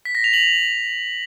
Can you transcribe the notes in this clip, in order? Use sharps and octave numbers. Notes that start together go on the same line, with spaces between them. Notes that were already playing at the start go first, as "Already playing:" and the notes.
B6
A#6
F7
F#7